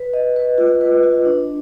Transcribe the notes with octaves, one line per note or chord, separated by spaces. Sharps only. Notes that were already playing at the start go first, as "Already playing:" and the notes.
Already playing: B4
D#5
B4
F4
B4
F4
D4